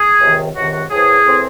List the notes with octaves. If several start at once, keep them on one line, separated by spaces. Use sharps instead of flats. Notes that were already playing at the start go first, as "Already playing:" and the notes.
Already playing: G#4
C#2 C3 D#3
C#2 C3 D#3 F#4
F#4
A2 E3 C4 G#4
A2 E3 C4